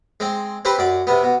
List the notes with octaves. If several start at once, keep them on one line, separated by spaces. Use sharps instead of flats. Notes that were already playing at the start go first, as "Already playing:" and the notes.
G#3 C4
C4 G4 B4 C5
F#2 D5
C3 B3
B2